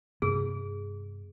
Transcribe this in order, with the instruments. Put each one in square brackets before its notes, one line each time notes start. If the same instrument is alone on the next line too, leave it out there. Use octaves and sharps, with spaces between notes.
[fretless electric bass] G2 C3 B3 [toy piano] G#4